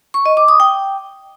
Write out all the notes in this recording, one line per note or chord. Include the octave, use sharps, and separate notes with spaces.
C#6
D#5
D6
D#6
G5